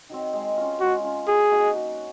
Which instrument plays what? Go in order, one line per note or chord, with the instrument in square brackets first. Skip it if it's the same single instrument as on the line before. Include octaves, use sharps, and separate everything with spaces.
[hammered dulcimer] D#3 F#3 C4
G#3
C#4 F4
[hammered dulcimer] G#3 [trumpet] F#4
[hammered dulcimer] C#4 F4
[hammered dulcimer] F#3 [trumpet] G#4
[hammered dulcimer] A#3 D#4 F#4
F#3